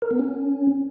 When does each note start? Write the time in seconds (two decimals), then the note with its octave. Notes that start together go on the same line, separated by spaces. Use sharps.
0.02 A#4
0.11 B3
0.19 C#4